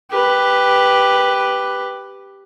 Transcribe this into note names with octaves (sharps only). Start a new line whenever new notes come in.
G4 B4